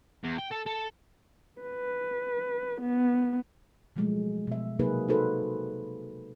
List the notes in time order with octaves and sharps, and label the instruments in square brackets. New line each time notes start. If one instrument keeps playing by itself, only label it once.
[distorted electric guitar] E2
G5
A4
A4
[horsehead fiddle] B4
B3
[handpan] B2 F3 F#3 G#3 A3
B2 E5
C3 F#3 A#3 D#4 G#4 B4
D#4 F#4 A4 B4 C5